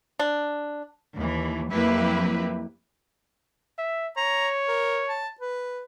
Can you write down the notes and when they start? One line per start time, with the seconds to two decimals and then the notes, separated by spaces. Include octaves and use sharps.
0.19 D4
1.15 D#2 E3
1.72 F2 F#3 A#3 E4 G4 B4
3.78 E5
4.17 C#5 A#5
4.68 A#4
5.08 A5
5.41 B4